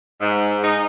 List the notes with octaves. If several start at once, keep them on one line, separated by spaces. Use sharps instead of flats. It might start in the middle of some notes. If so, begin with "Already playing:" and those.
G#2
D#4